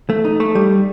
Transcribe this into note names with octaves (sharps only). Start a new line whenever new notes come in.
A3
D#4
A3
G3